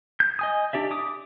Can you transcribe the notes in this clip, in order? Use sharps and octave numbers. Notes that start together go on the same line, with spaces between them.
G6
D#5 G#5 D#6
D4 G4 D5 E5
D6 D#6